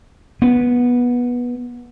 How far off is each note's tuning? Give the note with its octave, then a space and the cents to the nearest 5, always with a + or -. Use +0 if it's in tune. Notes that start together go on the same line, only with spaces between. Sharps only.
B3 -15